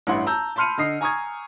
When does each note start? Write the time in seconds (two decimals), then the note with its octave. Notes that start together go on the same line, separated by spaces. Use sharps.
0.07 A1 G2 E4 F#5 C6
0.26 A5 A#5 E6 G6
0.56 A5 B5 C6 F6 C#7 D#7
0.78 D3 D#5 D#6 C7
1.01 G#5 A#5 C#6 D#6 G#6